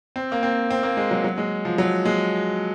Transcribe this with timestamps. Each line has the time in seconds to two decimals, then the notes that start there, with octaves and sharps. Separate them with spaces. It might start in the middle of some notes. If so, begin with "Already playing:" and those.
0.16 C4
0.32 A#3
0.43 C4
0.70 C4
0.83 A#3
0.97 G#3
1.11 F#3
1.24 F#3
1.38 G#3
1.65 F3
1.78 F#3
2.05 G#3